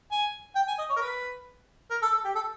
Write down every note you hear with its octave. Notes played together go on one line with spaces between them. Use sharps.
G#5
G5
G#5
D#5
C#5
A#4
B4
A#4
A4
A4
G4
A4